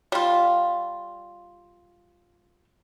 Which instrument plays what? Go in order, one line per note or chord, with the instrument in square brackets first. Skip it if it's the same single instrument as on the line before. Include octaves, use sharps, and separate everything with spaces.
[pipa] G3 F4